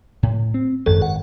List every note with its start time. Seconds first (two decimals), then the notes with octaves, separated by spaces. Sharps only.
0.23 A2
0.54 C4
0.86 G#1 F#2 A4
1.02 F#5